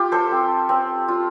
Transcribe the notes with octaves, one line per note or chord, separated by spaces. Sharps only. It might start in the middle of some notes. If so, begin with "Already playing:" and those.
Already playing: F4 G4 F5
A4 C5
C4
C4
F4